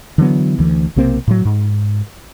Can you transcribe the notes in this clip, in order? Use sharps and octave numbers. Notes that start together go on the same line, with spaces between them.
D3 E3 F#3 B3
D2 E3
B1 C3 A#3 C4
A2 F#3
G#2